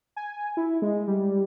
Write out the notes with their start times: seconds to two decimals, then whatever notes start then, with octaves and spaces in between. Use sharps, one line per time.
0.16 G#5
0.57 E4
0.82 G#3
1.07 G3